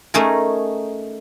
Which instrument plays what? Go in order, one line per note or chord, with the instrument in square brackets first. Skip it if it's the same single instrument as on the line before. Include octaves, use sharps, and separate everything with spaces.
[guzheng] A3 C#4 D#4 G#4 A#4